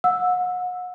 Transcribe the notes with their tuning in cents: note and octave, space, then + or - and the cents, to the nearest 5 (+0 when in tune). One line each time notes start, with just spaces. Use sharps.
F#5 -35 E6 +0